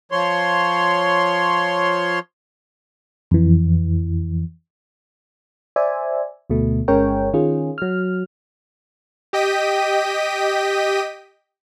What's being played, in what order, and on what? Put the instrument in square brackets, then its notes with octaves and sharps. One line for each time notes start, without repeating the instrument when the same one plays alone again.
[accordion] F3 C#5 C6
[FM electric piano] F2 E3
C5 D5 E5 G#5
D2 B2 A3
G1 G#3 C#4 A#4 C#5 G5
D#3 C#4 F4 G#4
F#3 F6
[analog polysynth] G4 D#5 G5 B6 D#7